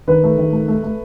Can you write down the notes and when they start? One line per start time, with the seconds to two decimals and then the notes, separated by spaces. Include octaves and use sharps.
0.08 D#3 B4
0.24 A3
0.38 D#3
0.53 A3
0.68 A3
0.84 A3